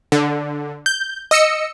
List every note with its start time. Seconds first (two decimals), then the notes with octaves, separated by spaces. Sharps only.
0.12 D3
0.86 G6
1.31 D#5 E6 C#7